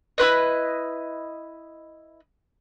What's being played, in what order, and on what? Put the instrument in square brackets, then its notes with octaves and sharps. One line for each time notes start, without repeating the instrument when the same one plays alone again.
[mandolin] E4 F4 B4 D#5